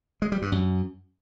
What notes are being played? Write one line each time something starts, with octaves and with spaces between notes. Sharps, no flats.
G#3
G3
G2
F#2